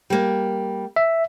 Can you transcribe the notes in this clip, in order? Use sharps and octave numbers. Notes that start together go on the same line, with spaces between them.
G3 A#3
E5